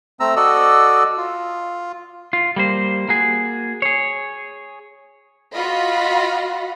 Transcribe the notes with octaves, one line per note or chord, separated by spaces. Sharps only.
A3 C4 A#5 E6
F#4 A4 D5 D#5 E6
F4
F4
G3 A#3 C5
A#3 F#4 G#4
G#4 C#5
F4 F#4 D#5 F5 B5